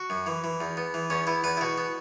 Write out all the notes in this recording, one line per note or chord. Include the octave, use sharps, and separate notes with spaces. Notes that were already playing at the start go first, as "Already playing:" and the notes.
Already playing: F#4
F#2
E3
E3
E2
B3
E3
E2 C#4
B3 E4
E2 B4
E4
B2 F#4
B3